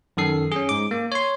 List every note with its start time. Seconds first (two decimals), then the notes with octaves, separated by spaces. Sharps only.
0.17 F#2 D#3 A4 C7
0.52 C#4 G#4
0.69 G#2 D6
0.91 A#3
1.12 C#5 C6